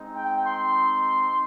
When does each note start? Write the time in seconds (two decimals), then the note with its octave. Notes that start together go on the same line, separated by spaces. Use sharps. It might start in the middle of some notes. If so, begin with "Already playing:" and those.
Already playing: G#3 C4 D#4
0.16 G5
0.45 C6